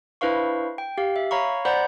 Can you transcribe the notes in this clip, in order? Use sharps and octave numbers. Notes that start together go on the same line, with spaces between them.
D4 E4 B4 C5 F5 C#6
G5
G4 F5
E5
C#5 F5 A#5 B5 C#6
C5 D5 F#5 A#5 B5 G6